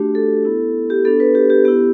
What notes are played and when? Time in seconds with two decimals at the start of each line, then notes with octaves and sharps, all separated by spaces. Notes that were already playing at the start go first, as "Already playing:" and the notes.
Already playing: A3 D4 F#4 G4
0.15 A4
0.45 B3 E4
0.90 G4
1.05 B3 D4 F#4 A4
1.20 B4
1.35 G4
1.50 G4
1.65 B3 E4 G4